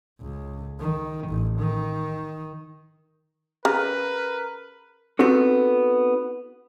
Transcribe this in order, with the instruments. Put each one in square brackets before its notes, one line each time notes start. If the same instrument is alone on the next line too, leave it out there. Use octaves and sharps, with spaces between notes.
[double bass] C#2
D#3
A1
D#3
[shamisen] C#3 [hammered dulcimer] A#4 [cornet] B4
[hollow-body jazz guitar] B3 C4 D#4 F#4 A4